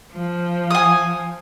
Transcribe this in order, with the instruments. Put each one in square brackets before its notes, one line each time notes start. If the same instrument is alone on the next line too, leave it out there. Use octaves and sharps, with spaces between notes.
[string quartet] F3
[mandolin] G#5 D#6